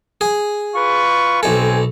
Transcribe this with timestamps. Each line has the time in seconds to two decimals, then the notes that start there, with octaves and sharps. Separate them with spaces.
0.21 G#4
0.76 F4 B4 C#6
1.43 B1 C4 A4 G#5